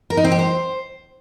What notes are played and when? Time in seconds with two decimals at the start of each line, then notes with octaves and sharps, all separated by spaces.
0.10 A#4
0.17 D#4
0.24 C4
0.32 G4
0.39 C5